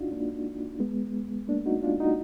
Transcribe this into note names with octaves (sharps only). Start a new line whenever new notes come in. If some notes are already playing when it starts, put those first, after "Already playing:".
Already playing: D4 D#4 F4 F#4
A#3 D4
G#3 B3
A#3 D4
D#4 F#4
D4 F4
D#4 F#4